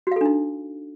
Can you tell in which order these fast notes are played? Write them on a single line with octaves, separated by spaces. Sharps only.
F#4 F5 A4 D4 D#4